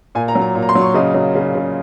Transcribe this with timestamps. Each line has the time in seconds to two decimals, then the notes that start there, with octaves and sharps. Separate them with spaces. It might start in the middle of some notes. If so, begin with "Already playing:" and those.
0.15 A#2 G#5
0.28 A#5
0.35 F#3
0.41 A#5
0.55 A#2
0.62 A#5
0.69 C6
0.75 F#3
0.81 C#6
0.94 C#3 D#5
1.14 F#3
1.35 C#3
1.55 C#3